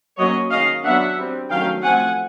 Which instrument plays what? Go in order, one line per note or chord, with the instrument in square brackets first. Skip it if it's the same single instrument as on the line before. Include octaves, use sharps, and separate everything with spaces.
[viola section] F#3 A#3 C#4 C#5 D#5
D#3 G#3 C#4 D#5 F5
F#3 B3 D4 E5 F#5
G3 C4
D#3 F#3 A3 C#4 F5 G5
F3 A3 C4 F#5 G#5